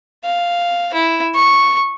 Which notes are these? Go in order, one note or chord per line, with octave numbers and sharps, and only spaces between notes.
F5
E4
C#6